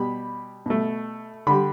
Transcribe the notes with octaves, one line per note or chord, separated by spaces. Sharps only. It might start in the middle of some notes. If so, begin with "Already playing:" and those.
Already playing: B2 G3 B5
B2 A3
D3 G3 B5